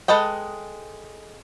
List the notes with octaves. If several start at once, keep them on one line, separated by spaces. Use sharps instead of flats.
G#3 A4 B4 D#5 G5